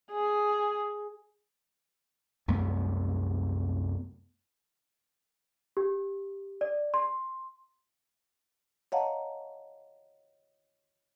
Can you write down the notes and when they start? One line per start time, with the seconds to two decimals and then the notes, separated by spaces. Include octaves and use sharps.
0.11 G#4
2.48 C2 F#2 A3 B3
5.77 G4
6.61 D5
6.94 C6
8.92 C#5 D#5 F5 F#5 A5 A#5